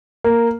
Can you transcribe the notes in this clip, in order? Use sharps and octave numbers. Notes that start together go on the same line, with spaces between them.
A#3